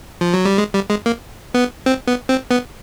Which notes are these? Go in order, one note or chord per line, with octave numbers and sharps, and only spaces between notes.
F3
F#3
G3
G#3
G3
G#3
A#3
B3
C4
B3
C4
B3